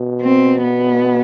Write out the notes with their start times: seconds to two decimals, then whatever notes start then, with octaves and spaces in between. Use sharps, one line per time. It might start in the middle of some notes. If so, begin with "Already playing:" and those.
Already playing: B2
0.21 C4
0.63 B3